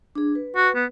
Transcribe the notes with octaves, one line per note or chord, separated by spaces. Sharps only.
D4 G#4
B4
F#4
B3